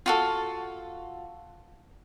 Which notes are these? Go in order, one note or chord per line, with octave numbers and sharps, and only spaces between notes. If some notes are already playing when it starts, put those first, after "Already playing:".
F4 F#4 A4